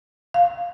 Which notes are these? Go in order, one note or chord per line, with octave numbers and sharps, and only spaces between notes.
F5